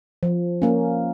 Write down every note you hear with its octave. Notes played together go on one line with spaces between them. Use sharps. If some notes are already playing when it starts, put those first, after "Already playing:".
F3
A#3 C#4